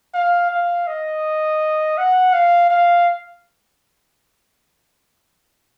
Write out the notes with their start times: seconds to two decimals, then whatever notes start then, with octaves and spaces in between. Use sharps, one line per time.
0.14 F5
0.51 F5
0.87 D#5
1.98 F#5
2.33 F5
2.71 F5